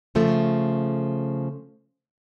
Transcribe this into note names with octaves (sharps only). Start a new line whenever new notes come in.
C#3 F3 A3